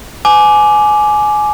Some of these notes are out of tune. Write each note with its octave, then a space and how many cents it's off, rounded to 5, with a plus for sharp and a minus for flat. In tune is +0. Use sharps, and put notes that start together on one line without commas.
G#5 +20 D6 +0